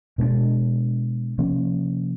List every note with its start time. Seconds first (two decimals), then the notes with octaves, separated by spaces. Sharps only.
0.18 B2 G#3 B3 D4
1.38 C3 F3 A#3 C#4